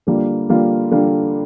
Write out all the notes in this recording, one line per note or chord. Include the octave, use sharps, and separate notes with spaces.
D3 G3 A#3 F4
D3 G3 A#3 F4
D3 G3 A#3 F4